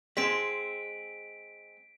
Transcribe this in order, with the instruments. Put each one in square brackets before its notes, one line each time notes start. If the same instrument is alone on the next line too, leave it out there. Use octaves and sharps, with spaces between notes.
[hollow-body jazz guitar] G#3 C4 [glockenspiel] B6 D7